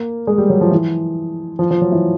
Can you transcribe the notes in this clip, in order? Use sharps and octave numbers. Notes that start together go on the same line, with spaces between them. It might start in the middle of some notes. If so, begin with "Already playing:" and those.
Already playing: A#3
G#3
G3
F#3
F3
E3
F3
F3
F#3
E3